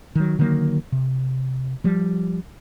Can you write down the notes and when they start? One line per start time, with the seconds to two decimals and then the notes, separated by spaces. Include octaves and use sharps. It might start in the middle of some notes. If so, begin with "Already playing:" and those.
0.15 D#3 F#3
0.39 D3 D#3 F#3 A#3
0.92 C3
1.84 F3 G3